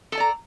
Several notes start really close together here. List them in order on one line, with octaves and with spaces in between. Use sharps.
A4 A5 D5 A#5